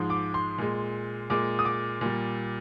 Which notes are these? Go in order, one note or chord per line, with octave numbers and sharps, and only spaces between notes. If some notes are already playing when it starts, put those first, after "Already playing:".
Already playing: G#2 F3 G#3
D6
C6
A#2 G#3
A#2 G#3 D6
D#6
D6
A#2 G3